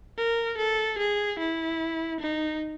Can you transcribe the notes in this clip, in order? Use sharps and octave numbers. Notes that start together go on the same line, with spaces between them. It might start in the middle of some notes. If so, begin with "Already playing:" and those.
A#4
A4
G#4
E4
D#4